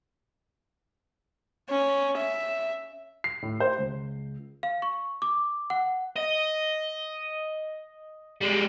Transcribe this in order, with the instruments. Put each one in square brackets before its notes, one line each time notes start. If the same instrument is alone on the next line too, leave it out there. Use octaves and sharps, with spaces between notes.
[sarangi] C#4
E5
[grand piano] C7
A2
C5
C#2
[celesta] F5
C#6
D6
F#5
[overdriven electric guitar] D#5
G3 G#3